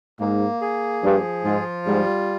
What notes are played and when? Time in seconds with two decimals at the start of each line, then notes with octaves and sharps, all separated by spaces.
0.19 G#2 A#3
0.61 G#4
1.02 G2 F3
1.44 G#2 F4
1.86 G#2 G3